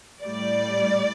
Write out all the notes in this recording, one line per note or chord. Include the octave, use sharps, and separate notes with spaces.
A2 G3 D5